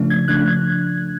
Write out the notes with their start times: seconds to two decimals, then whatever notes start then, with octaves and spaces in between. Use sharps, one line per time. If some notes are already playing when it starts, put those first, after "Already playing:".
Already playing: C#3 F3 A3 D4
0.10 G#6
0.28 C#3 F3 A3 D4 F#6